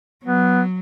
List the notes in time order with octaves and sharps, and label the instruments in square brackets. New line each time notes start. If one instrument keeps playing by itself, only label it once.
[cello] F#3 [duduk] B3